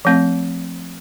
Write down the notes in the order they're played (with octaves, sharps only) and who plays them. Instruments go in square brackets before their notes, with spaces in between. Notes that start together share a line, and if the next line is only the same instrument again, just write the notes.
[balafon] F3 A3 C4